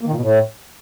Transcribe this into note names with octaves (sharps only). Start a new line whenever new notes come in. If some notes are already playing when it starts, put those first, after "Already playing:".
A#3
D#3
A#2
B2
A2